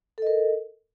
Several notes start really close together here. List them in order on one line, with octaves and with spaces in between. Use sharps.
A4 D#5 A#4